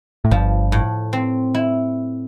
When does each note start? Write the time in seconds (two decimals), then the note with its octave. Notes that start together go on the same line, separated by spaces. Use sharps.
0.25 A2
0.31 G1 G2 F3
0.72 A2
1.13 C4
1.55 E4